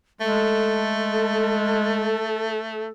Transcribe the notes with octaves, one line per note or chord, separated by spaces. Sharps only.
G#3 A3 A4